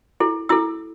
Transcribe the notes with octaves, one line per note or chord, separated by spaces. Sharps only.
E4 A4
E4 A4 E6